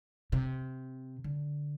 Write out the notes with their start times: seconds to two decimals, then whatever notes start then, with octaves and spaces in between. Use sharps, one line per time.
0.32 C3
1.24 D3